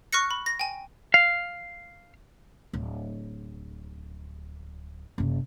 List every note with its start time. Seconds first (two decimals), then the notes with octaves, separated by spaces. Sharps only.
0.13 C#6 F6 F#6 A#6 C#7
0.31 B5
0.46 A#6
0.59 G5 G#5
1.14 F5
2.73 D1
5.18 F#1 C3